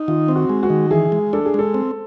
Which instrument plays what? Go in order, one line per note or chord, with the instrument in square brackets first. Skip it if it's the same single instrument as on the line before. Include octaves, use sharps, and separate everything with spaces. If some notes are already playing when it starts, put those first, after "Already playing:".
Already playing: [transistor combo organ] D#4
[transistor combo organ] D#3 [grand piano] F4
[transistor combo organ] C4
[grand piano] F#4
[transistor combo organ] G#3
[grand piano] F#4
[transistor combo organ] D#3
[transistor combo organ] E3 [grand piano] G#4
[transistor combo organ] G#3
[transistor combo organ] D4 [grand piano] A4
[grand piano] G#4
[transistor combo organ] G#3 [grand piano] A4
[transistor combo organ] C4